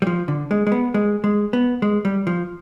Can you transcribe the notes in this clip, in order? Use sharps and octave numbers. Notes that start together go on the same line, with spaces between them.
G3
F3
D3
G#3
G#3
B3
G#3
G#3
B3
G#3
G3
F3